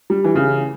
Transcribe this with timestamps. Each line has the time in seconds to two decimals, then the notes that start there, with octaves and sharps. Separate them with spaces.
0.10 G3
0.24 E3
0.35 C#3